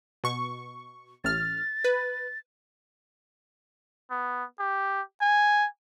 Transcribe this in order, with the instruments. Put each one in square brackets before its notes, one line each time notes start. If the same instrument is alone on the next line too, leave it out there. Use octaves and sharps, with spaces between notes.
[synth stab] B2 C#6
[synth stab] A1 F6 [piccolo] A6
[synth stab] B4
[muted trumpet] B3
G4
G#5